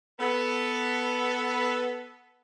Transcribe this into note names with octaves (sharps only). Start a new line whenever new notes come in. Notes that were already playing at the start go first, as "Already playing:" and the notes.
B3 A4